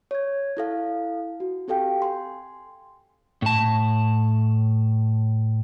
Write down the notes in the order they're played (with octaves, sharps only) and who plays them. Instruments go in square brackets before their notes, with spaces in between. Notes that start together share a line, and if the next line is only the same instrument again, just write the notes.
[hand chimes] C#5 G#6
E4 A4 F5
F#4
C4 G4 A4 F5 G5
G#5 C6
[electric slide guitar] A2 A5